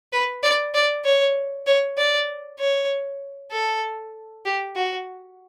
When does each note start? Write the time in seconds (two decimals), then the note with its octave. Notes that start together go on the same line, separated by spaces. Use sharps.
0.13 B4
0.43 D5
0.74 D5
1.05 C#5
1.67 C#5
1.98 D5
2.59 C#5
3.51 A4
4.45 G4
4.75 F#4